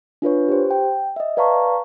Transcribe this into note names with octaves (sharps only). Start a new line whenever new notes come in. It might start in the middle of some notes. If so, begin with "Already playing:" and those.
D4 F4 B4 C#5
G4 C5
G5
D#5 E5
B4 D5 F5 A5 A#5 C#6